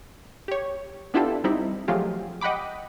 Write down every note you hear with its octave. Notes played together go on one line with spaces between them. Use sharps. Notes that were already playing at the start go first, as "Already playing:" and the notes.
G4 C#5
B3 D4 E4 F4 G4 A4
G3 C4 D#4 E4
F3 F#3 G#3 A3 F4 G4
D#5 F#5 G5 B5 D6